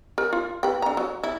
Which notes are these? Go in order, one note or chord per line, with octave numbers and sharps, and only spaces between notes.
A#4
F4
B4 G5
D3 A#5
F#3
E4